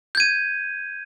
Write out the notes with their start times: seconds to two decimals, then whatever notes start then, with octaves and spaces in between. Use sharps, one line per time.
0.15 G6
0.17 G#6
0.20 D#7